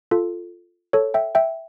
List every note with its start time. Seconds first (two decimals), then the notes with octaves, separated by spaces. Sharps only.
0.11 F4 A4
0.93 A4 C#5
1.14 E5 G5
1.35 E5 G5